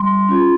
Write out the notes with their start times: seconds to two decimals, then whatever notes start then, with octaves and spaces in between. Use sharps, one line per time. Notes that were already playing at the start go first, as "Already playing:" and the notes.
Already playing: G3 C6
0.29 C#4 F4